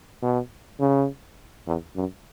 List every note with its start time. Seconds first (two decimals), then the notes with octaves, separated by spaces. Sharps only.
0.22 B2
0.80 C#3
1.67 E2
1.96 F#2